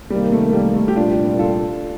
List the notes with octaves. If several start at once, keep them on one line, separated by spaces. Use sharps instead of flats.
C3 D#3 G3 A#3
A3
G3
A3
G4
C2 A#2 G3 D4 F4
F4 A4